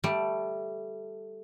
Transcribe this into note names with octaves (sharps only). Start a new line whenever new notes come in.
G3 A3